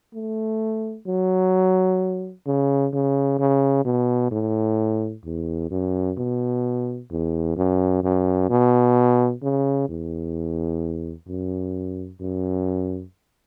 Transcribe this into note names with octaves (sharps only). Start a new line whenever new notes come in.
A3
F#3
C#3
C#3
C#3
B2
A2
E2
F#2
B2
E2
F#2
F#2
B2
C#3
E2
F#2
F#2